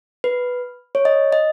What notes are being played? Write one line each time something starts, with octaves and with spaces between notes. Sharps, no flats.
B4
C#5
D#5
D#5